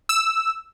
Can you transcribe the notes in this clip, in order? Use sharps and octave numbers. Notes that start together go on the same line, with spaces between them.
E6